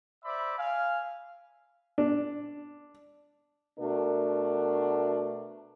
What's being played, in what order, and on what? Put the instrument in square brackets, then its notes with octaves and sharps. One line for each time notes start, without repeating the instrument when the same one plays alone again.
[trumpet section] C5 D5 E5 B5
F5 G#5
[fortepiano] D4
[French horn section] B2 A3 D4 F#4 A#4